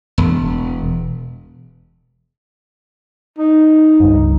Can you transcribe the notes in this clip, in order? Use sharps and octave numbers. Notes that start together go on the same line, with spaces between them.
E1
D#4
C#2 G2